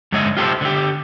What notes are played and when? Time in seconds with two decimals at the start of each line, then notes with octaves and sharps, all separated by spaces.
0.12 G2 D3 G#3 C#5 D#5 E5
0.37 F4 G4 A4 B4 C5 E5
0.61 D3 G4